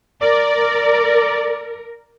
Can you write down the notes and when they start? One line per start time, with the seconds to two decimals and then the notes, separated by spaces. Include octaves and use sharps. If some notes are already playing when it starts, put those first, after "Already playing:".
0.21 A#4 D5